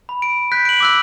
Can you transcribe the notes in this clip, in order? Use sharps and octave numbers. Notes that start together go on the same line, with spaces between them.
B5
D7
F#6 G6 B6
D7 F#7
D6 E6 F#6